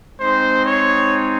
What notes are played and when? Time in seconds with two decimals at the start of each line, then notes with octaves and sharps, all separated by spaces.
0.18 G#3 C4 D#4 C5
0.65 C#5